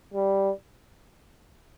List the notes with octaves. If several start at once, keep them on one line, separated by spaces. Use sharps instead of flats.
G3